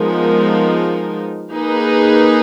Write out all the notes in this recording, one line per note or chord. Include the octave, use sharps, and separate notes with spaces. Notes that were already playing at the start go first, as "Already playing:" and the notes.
Already playing: F3 G#3 B3 D#4 A#4
A#3 D#4 G#4 B4